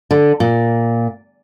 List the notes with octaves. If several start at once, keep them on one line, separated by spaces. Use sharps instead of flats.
D3
A#2